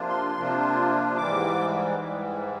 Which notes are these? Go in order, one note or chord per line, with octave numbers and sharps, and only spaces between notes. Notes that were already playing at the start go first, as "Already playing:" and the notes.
Already playing: C3 F3 A#3 D4 F4
C6
C3 F3 A#3 D4 F4
G#2 E3 G3 D6
G#2 E3 G3